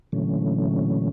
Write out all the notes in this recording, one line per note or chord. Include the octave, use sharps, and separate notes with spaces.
A#2 D3 E3 F#3 A3 C#4